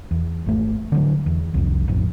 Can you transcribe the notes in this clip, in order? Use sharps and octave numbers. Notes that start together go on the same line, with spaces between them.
E2
G#1 A3
D3 E3 F#3
E2
C2 F2
A1 F2